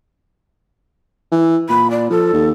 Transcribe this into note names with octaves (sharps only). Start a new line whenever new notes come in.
E3
A#2 B5
D5
F3 A4
D#2